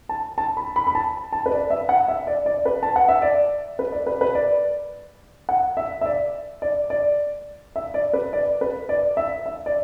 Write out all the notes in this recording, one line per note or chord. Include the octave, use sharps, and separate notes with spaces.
A5
A5
B5
B5
B5
A5
A5
B4
D5
E5
F#5
E5
D5
D5
B4
A5
F#5
E5
D5
B4
D5
B4
B4
D5
F#5
E5
E5
D5
D5
D5
E5
D5
B4
D5
B4
D5
E5
E5
D5